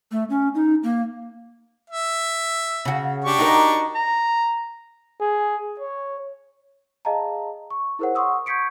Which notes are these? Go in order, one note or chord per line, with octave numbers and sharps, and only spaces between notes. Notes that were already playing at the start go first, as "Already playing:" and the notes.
A3
C#4
D#4
A#3
E5
C#3 F#4
D4 G4 C#6
D#4 F#4 A#4
A#5
G#4
C#5
G#4 D#5 F5 A5 A#5
C#6
E4 G#4 A#4 C5 C#5 F#5
F#5 C6 C#6 D#6 E6
C#6 G6 G#6 B6 C#7 D7